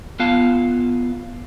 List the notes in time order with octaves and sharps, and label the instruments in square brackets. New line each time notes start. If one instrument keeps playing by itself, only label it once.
[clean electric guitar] B3 F4 F5 A5